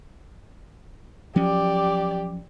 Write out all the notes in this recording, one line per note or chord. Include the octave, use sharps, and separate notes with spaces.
F3 F#3 C#4 G4 D5